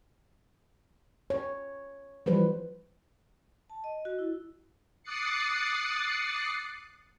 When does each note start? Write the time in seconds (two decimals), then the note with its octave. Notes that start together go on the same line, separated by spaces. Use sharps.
1.30 C#5
2.26 E3 F3 G3 B4 C5
3.70 A5
3.84 D#5
4.05 F#4
4.19 E4
5.03 D6 D#6 F#6 A6 C7 C#7